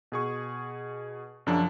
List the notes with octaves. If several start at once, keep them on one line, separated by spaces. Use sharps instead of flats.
B2 G#4 C#6
F#2 C#3 F3 F#3 D4